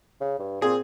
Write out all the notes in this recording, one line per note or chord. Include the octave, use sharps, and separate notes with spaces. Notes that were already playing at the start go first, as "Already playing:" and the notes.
C#3
G2
A#2 C4 G#4